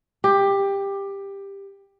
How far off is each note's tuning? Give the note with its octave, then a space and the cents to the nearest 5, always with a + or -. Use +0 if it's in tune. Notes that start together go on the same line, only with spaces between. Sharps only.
G4 +15